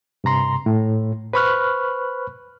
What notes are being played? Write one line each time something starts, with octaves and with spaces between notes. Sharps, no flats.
G2 C3 A#5 C6
A2
B4 C5 B5 C#6 F6 F#6